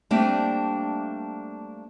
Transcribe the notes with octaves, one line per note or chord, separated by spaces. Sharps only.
G3 A3 A#3 C4 D4 G5